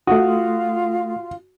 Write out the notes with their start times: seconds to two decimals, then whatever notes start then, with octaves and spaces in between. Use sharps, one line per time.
0.07 A3 F4 F#4 D#6